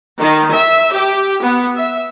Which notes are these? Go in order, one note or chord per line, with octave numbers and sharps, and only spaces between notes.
D#3
E5
G4
B3
E5